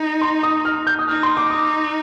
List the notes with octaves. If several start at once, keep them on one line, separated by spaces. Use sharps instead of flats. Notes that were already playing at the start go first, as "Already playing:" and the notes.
Already playing: D#4
C6
D#6
F6
G6
D#6
D#4 F6
C6
D6
D#6